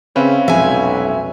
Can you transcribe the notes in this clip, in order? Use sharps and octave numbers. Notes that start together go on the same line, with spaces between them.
C#3 C4 C#4 B4 E5 F5
F1 B1 G#3 E5 G#5